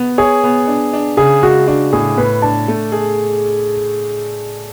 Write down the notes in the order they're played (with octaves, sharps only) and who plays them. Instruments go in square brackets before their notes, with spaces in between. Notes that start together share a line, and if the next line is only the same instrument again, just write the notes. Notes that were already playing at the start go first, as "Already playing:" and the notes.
Already playing: [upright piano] B3
[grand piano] G#4 [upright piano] C#5
[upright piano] B3
D4
D4
[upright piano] C#3 [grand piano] G#4
[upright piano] G#3 [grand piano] F#4
[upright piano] D4 [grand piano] F#4
[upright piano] A2 [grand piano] G#4
[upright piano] A2 [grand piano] B4
[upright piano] D4 [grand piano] A5
[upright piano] A3
G#4